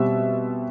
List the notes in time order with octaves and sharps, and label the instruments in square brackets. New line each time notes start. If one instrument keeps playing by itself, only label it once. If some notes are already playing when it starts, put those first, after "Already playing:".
Already playing: [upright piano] B2 G3 C4 E5